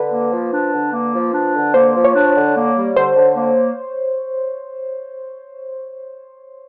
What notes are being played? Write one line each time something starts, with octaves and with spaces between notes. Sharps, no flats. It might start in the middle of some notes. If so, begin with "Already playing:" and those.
Already playing: D3 B4
A#3
F3
D4
D3
A#3
F3
D4
D3
A#3 C5
F3
C#5
D4
D3
A#3
G3
D3 C5
D3
A#3